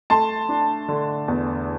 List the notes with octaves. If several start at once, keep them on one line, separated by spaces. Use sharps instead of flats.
A3 A5 C6
D4
D3
E2